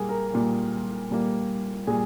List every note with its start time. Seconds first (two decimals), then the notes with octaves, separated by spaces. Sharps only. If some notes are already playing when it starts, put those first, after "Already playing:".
Already playing: A#2 G3 A#3 G#4
0.09 A#4
0.33 A#2 G3 A#3
1.11 A#2 G3 A#3
1.87 A#2 G3 G#4